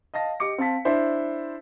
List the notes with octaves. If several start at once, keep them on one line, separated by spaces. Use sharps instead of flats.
D#5 F5 A5 A#6
G4 D#5 D6 C#7
C4 F5 A5 B6
D4 E4 C5 E5